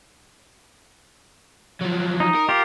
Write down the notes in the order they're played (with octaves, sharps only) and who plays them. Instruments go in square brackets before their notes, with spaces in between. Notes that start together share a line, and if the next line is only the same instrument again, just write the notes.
[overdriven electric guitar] F3 F#3
[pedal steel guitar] D#4
[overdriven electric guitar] A#4
[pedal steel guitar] F4 G4